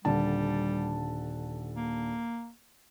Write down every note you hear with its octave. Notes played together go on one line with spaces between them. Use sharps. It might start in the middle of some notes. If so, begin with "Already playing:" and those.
D#1 D3 G3 A5
A#3